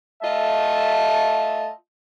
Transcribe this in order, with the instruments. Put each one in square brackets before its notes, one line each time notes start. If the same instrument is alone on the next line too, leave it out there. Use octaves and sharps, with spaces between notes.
[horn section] A3 F4 D#5 E5 A5